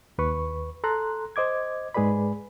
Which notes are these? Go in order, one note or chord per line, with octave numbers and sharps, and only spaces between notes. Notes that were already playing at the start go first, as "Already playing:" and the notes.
D#2 B4 C#6
A4 A#5 C6 F#6
C5 D#5 D6 G#6
G#2 G#3 G#4 B4 D5 B5